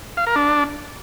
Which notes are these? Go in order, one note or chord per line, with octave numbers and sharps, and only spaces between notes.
F5
A#4
D4